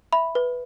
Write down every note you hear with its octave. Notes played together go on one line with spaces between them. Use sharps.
E5 B5
B4